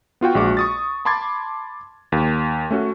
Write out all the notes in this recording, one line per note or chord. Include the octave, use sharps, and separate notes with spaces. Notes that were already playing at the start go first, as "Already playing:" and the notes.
B3 F4 F#4 G5
A#1 G#3 F#4 D6
C#6 D#6 A6
A5 B5 C6 D6 G#6 A6
D#2
A3 C#4 F#4